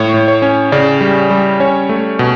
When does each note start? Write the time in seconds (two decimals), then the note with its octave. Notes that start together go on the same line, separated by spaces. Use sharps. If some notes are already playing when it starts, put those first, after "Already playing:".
Already playing: A2 C#5
0.14 A2
0.28 C#5
0.42 C#4
0.72 C#3 D5
1.01 G3
1.30 G3
1.60 C#4 C#5
1.89 A3
2.19 B2